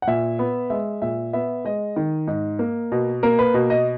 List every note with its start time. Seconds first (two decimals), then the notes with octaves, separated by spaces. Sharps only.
0.02 F#5
0.07 A#2 E5
0.39 B3
0.70 G#3 E5
1.02 A#2 E5
1.33 B3 E5
1.65 G#3 D#5
1.96 D#3
2.28 G#2
2.59 A#3
2.92 B2
3.23 A#3 A#4
3.39 B4
3.54 B2
3.70 D#5